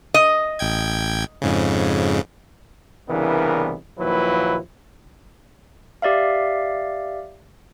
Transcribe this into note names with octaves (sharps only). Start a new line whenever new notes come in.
D#5
A1 G5 G#6
F2 G#2 C#3
C2 C#3 E3 B3 D4 A#4
D#2 A#2 F3 F#3 E4 B4
G4 D5 E5 F5